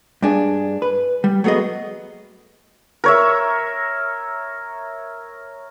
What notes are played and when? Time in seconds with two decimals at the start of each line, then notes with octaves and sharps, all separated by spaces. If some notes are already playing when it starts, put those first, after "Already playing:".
0.22 G2 D4 G#4
0.82 B4
1.24 G3
1.44 F#3 A3 B3 G#4 D#5
3.04 A#4 C#5 E5